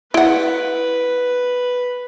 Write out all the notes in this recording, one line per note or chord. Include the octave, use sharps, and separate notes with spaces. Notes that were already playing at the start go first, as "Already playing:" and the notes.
E4 B4 F#5